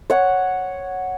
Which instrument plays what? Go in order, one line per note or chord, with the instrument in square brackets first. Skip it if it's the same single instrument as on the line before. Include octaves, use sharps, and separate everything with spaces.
[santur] C#5 F#5